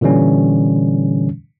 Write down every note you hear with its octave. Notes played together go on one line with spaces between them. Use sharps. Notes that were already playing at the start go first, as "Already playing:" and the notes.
A#2 D3 E3 G3 C#4